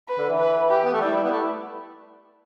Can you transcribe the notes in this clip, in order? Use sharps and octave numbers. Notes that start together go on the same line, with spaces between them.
B4
D3
E3
B4
G4
B3
A3
G3 E4
G3
B3
A3